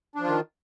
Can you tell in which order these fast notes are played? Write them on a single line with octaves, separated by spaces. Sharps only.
D4 F3 F4 D#3